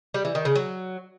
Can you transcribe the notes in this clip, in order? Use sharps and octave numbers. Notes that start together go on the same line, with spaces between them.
G3
E3
D#3
C#3
F#3